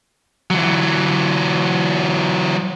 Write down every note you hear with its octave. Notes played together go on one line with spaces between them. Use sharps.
E3 F#3